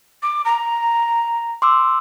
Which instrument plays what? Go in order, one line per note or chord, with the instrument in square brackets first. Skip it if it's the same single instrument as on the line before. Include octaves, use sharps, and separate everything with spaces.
[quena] D6
A#5
[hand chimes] C6 D6 E6